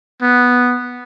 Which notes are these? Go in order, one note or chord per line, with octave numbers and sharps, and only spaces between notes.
B3